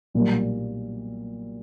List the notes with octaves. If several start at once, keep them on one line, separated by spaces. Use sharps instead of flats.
B1 A#2 G3 A#3